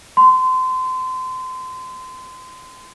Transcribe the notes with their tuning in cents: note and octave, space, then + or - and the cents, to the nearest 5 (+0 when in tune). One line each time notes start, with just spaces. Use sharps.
C6 -30